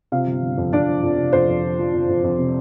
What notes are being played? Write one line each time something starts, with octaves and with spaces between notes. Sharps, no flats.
C3 F4 F5
G1
G1
F2
F2 D4 D5
F3
F2
C3
F2 C5
F2
F3
F3
F2
F2
F2
C3